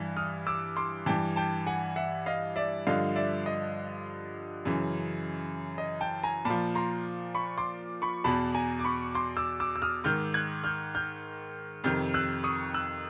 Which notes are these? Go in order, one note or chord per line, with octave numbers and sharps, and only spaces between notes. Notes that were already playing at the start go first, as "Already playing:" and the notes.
Already playing: G2 E3
D#6 F6
D6 E6
C6 D6
G2 E3 G5 A5
G5 A5
F#5 G#5
E5 F#5
D#5 F5
D5 E5
G2 D3 F3 D#5 F5
D5 E5
D#5
F#2 C#3 E3
D#5
G5 A5
G#5 A#5
A#2 F3 A5 B5
A#5 C6
B5 C#6
C6 D6
B5 C#6
E2 B2 A5 B5
G#5 A#5
D6
B5 C#6
C6 D6
D6 E6
D6 E6
E6
D#6 F6
G#2 D#3 F6 G6
F#6 G#6
F6 G6
F6 G6
F2 C3 D#3 F6 G6
E6 F#6
C#6 D#6
E6 F#6